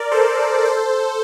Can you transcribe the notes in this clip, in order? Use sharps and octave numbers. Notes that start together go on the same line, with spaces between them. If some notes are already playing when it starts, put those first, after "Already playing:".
Already playing: A#4 D5
A4 C5
A4 C5